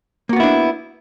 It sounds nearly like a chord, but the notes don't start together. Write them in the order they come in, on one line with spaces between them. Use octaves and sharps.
A#3 F#4 B3 E4 D4